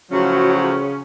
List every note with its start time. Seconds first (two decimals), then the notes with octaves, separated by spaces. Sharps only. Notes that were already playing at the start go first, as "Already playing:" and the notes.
0.11 A2 C#3 F3 F#3 C#4 F#4